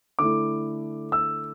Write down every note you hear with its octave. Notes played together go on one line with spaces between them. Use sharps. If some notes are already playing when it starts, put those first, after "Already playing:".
D3 A3 E4 D6
E6